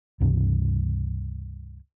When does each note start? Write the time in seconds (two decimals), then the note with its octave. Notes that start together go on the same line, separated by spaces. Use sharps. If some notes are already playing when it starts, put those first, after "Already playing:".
0.20 C#2 G2 C3 E3